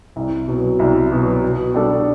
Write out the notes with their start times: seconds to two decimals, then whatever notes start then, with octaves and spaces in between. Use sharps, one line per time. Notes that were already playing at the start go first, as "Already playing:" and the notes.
0.16 C2
0.48 B2 F#3
0.79 C2
1.12 B2 F#3
1.42 B2
1.74 G3 D4 A4